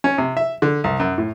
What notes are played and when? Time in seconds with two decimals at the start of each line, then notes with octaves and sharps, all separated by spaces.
0.04 C#4
0.18 C3
0.37 E5
0.62 D3
0.84 C2
1.00 F#2
1.18 A2